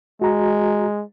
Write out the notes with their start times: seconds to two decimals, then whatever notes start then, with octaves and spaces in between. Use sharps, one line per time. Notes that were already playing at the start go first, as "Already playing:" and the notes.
0.22 G#3 F#4 A#5